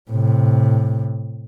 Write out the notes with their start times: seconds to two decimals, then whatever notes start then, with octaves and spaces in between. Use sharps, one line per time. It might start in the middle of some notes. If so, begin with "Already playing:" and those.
0.11 A2 C3